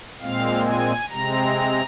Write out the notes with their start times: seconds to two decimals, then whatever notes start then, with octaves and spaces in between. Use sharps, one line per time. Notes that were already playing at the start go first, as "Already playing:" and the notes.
0.21 A#2 G#3 C4 F5
0.66 G#5
1.10 C3 G#3 C4 A#5